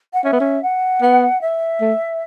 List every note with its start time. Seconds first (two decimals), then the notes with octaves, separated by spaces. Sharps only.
0.13 F#5
0.24 C#4 E5
0.33 B3
0.40 C#4
0.63 F#5
1.02 B3
1.41 E5
1.81 A3